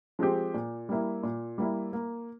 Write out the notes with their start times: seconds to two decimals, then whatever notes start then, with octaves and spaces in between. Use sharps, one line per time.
0.19 F3 G#3 C4 G4
0.54 A#2
0.89 G3 A#3 E4
1.23 A#2
1.58 G3 A#3 E4
1.93 A#3